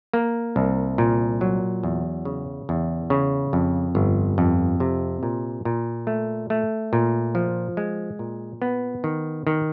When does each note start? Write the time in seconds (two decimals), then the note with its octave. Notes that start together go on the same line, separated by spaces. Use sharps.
0.13 A#3
0.56 C2
0.98 A#2
1.41 F#3
1.83 E2
2.25 C#3
2.69 E2
3.10 C#3
3.53 F2
3.95 G1
4.38 F2
4.80 C3
5.23 A#2
5.65 A#2
6.07 A3
6.50 A3
6.93 A#2
7.35 F3
7.77 G#3
8.19 A#2
8.62 B3
9.04 D#3
9.47 D#3